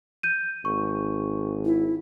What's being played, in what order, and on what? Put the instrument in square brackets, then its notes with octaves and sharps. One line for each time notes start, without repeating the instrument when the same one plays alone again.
[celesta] G6 D#7
[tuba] G#1 [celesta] C#6
[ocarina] E4